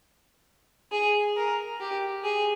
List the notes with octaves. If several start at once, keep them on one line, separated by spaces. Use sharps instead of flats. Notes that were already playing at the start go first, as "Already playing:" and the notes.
G#4
A#4
G4
G#4